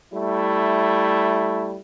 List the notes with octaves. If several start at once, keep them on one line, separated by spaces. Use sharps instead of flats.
G3 A3 E4